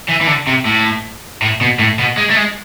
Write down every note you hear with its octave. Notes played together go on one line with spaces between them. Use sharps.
E3
E3
D3
C3
A2
A2
B2
A2
B2
G#3
A3
G#3